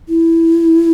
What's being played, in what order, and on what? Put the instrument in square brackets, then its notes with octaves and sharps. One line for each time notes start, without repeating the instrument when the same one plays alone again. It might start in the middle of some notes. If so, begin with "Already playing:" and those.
[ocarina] E4